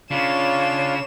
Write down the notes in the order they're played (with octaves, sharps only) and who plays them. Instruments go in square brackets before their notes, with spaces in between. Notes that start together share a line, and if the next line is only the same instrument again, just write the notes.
[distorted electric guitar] C#3 [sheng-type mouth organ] D4 F4 [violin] C#5 E7